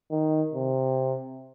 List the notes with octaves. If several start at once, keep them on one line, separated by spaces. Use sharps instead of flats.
D#3
C3